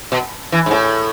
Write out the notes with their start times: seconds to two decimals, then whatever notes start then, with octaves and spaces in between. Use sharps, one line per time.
0.12 B2
0.52 E3
0.66 G#2
0.71 A2